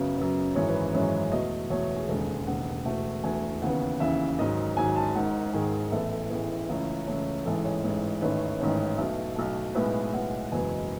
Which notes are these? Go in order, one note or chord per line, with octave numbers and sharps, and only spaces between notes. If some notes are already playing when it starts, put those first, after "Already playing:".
Already playing: F#2 C#3 F#3 B3 C#5
F#2 C#3 F#3 B3
G#1 F#2 E3 G#3 C#4 C#5
B4
C#5
G#1 F#2 E3 G#3 C#4
E2 B2 A3 D#5
E2 B2 A3 C#5
G#4
E1 D#2 C#3 G#3 A4
E1 D#2 C#3 G#3 F#5
E1 E2 B2 A3 F#5
E1 E2 B2 A3 G#5
D#2 C#3 E3 B3 F#5
D#2 C#3 E3 B3 E5
G#1 G#2 F#3 D#5
G#1 G#2 F#3 G#5
A5
G#1 G#2 D#3 F#5
G#1 G#2 D#3 G#4
A1 A2 E3 B3 A4
A4
A1 A2 E3 B3 G#4
C#2 C#3 E3 A3 C#4
C#2 C#3 E3 A3 C#4
A1 G#2 E3 G#3 A4
C#5
A1 G#2 E3 G#3 C#5
A1 G#2 D#3 A3 C#4 B4
A1 G#2 D#3 A3 C#4
B1 B2 A3
B1 B2 A3
B1 A2 G#3 B3 B4
B1 A2 G#3 B3 F#5
F#1 E2 B2 G#3 B3 G#5